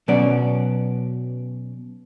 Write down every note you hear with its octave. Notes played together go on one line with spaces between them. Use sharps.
B2 F#3 B3 C#4 D5